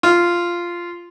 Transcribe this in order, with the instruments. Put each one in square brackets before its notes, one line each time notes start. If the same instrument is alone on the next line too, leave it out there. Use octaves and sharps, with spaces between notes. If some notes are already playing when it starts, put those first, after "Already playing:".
[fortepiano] F4